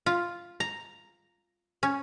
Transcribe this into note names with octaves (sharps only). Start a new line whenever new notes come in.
F4
A#5
C#4